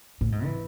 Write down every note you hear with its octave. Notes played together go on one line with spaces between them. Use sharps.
A2
G#2
E3